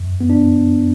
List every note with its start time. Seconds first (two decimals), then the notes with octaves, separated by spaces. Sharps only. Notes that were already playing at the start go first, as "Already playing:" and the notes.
Already playing: F#2
0.11 F2
0.21 B3
0.30 D4